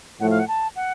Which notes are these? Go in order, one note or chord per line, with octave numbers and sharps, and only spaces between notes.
A2 F3 A3 F#5
F5
F#5
A5
F#5